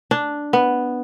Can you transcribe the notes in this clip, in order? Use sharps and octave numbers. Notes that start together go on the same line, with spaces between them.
D4
B3